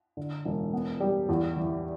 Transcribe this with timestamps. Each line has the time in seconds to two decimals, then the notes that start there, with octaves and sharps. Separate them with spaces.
0.17 D3
0.45 E1
0.74 B3
1.00 G3
1.29 E2
1.57 E3